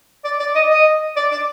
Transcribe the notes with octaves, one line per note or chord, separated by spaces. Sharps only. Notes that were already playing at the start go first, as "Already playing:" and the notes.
D5
D5
D#5
D#5
D5
D5